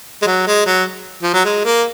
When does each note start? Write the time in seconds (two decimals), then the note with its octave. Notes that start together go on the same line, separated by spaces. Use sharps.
0.22 G#3
0.27 F#3
0.47 G#3
0.66 F#3
1.23 F3
1.34 F#3
1.45 G#3
1.65 A#3